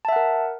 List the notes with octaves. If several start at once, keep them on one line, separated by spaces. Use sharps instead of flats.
A#4 E5 F#5 A5